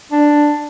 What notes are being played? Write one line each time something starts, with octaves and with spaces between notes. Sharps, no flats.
D4